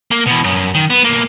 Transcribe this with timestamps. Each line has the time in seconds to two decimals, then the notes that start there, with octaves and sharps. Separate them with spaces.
0.11 A#3
0.26 B2 E3
0.44 F#2
0.74 D#3
0.90 B3
1.04 B1 A#3